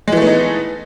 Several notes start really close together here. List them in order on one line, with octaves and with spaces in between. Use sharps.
G#3 E3 A3 B3 D#4